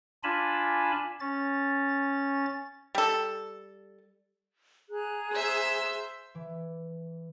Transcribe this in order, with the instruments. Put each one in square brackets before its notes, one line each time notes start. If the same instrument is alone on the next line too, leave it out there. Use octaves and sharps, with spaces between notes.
[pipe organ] D4 F4 G#5 A5 B5
C#4 A6
[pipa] G3 A4
[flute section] G#4 A#5 F#6
[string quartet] C5 E5 E6
[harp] E3